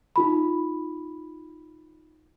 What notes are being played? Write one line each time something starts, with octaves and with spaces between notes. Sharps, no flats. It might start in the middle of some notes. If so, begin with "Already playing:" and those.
D#4 F4 B5